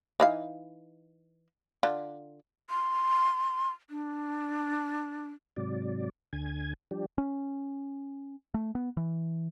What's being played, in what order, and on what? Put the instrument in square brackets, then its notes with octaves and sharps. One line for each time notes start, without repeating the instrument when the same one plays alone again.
[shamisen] E3 D#4 F5
D3 F4
[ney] C6
D4
[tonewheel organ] G#2 C3 F#3 D5
D2 D3 G#5 G#6
F3 G3 D4 G4
[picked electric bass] C#4
A3
B3
E3